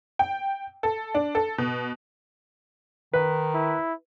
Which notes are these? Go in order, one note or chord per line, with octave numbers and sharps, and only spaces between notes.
G5
A4
D4
A4
B2
D#3 B4
E4